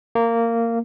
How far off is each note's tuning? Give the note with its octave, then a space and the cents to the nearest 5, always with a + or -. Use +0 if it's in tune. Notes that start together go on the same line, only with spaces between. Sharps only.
A#3 -15